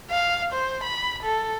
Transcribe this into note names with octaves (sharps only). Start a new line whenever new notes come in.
F5
C5
B5
A4